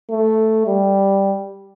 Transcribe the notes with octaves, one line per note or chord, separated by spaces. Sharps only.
A3
G3